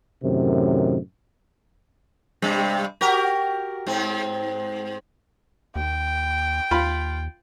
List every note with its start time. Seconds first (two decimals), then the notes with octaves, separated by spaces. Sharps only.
0.23 F#2 A2 C3 D#3
2.42 G2 C3 G3
3.01 F#4 G4 A#4
3.87 G#2 C4
5.76 D#2 G5
6.71 D#2 F4 B5